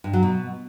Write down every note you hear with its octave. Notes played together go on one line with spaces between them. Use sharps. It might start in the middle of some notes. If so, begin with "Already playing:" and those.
G2
F#3
B2